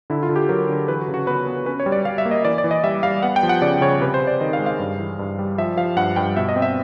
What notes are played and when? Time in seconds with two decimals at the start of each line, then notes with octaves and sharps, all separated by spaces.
0.10 D3 E4
0.23 F4
0.29 D3
0.36 G4
0.49 F#3 A#4
0.69 D3
0.88 E3 B4
1.01 F#4
1.08 C#3
1.14 F#4
1.27 B3 B4
1.47 B3
1.66 C#4 B4
1.80 C#5
1.86 G3
1.92 D5
2.05 G3 F5
2.18 E5
2.25 A#3
2.31 D#5
2.45 E3 D5
2.58 D5
2.64 E3
2.71 D#5
2.84 G3 E5
3.03 G3 F5
3.23 B3 F#5
3.36 G5
3.43 F3
3.49 F#5
3.62 C#3 D5
3.81 C#3 C#5
4.01 C3 B4
4.14 C5
4.21 C3
4.27 D5
4.40 D#3 D#5
4.53 F5
4.59 G#3
4.66 F5
4.79 G2
4.99 E3
5.19 G2
5.39 G3
5.58 F3 E5
5.77 F3 F5
5.96 G2 F#5
6.16 G2 G5
6.36 B2 E5
6.49 D#5
6.56 C4
6.62 E5